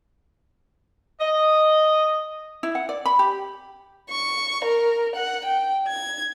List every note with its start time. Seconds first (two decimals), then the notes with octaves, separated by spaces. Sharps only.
1.21 D#5
2.63 E4
2.75 F#5
2.89 D5
3.06 B5
3.19 G4
4.10 C#6
4.64 A#4
5.16 F#5
5.45 G5
5.88 G#6